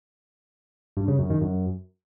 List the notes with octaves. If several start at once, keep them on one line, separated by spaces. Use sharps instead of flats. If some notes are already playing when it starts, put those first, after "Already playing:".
G2
C#3
F#2
D#3
F#2